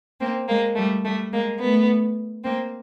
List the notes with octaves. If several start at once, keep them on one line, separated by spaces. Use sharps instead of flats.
A#3 C4
G#3 A#3
G3 A3
G3 A3
G#3 A#3
A3 B3
A#3 C4